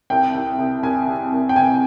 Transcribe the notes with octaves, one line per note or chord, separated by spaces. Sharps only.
C2 G5
C2
C2
C2 G#5
C3
C2
G5
C3 G#5